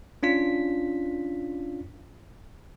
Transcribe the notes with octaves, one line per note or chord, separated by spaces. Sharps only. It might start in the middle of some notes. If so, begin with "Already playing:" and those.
C#4 D4 F4 B6